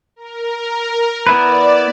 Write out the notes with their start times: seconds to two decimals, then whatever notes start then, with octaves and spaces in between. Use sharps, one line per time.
0.16 A#4
1.27 B3 E4 B4 D5